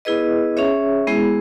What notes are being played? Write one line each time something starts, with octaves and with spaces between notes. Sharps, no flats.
B3 E4 G#4 B4 D#5
C#4 G#4 C#5 E5
G#3 B3 E4 G#4